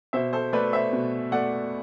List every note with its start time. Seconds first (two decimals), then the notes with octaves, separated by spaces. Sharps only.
0.13 B2 C5 E5
0.33 A4 C5
0.53 A3 B4 D5
0.73 C5 E5
0.93 B2
1.32 A3 D5 F#5